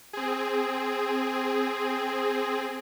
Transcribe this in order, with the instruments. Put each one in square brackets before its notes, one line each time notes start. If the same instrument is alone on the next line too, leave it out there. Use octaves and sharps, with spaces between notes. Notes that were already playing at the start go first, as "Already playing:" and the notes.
[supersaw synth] C4 G#4